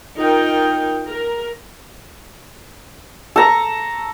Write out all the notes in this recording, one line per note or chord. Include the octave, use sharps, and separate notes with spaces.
D#4 F4 A#4 G5
A#4
A4 A#5 C#6